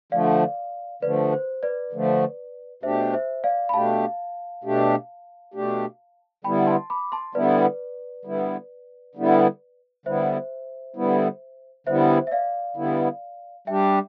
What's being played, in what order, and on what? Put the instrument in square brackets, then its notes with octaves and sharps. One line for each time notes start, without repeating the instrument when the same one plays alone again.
[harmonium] D3 F3 A3 [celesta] D5 F5
[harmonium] D3 F3 A3 [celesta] B4 D5
[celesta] C5
B4 D5
[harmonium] D3 F3 A3
[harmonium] B2 A3 D4 G4 [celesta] C5 E5
[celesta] C5 E5
D5 F5
B5
[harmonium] B2 A3 D4 G4 [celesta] F5 A5
[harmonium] B2 A3 D4 G4
B2 A3 D4 G4
[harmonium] D3 G3 B3 E4 [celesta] G5 B5
[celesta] A5 C6
B5 D6
A5 C6
[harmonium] D3 G3 B3 E4 [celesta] B4 D5
[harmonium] D3 G3 B3 E4
D3 G3 B3 E4
[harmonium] D3 G3 B3 E4 [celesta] C5 E5
[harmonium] D3 G3 B3 E4
[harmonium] D3 G3 B3 E4 [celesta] C5 E5
[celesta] E5
D5 F5
[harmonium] D3 G3 B3 E4
[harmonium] G3 D4 G4 [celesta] E5 G5